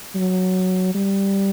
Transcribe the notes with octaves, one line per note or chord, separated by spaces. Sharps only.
F#3
G3